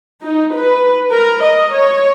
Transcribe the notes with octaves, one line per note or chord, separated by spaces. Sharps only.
D#4
B4
A#4
D#5
C#5